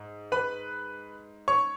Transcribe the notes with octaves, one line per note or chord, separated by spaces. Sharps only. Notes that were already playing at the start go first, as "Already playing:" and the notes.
Already playing: G#2
B4 B5
C#5 C#6